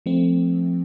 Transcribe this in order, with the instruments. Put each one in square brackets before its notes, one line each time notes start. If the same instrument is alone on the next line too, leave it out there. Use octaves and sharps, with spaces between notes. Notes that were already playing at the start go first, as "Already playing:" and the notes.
[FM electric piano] F3 A3 C4